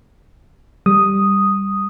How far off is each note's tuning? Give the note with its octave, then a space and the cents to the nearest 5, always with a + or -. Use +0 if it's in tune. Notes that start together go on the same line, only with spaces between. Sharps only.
G3 +0 D#6 +0